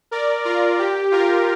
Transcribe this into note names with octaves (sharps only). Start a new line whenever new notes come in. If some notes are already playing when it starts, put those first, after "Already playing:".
A#4 D5
F4 A#4
G4
F4 A#4